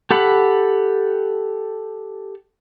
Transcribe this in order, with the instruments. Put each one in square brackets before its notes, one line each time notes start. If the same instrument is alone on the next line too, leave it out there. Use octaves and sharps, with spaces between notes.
[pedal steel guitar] G4 A4 F#5 B5